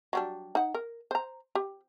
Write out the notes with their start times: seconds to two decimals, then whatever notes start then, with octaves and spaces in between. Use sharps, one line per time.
0.13 F#3 G3 D4
0.55 D#4 F#5
0.74 A#4
1.11 C5 A#5
1.55 G4